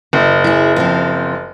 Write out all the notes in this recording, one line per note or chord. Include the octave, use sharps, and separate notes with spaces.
F#1 E4
E4 G#4
F3 C4 F4